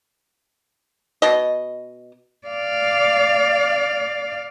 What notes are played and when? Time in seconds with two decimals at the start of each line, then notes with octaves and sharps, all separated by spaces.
1.22 B2 D#5
2.48 D5 F5